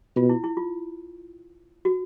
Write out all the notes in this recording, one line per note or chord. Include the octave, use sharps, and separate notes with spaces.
B2 F4
E4
E4
F4
F#4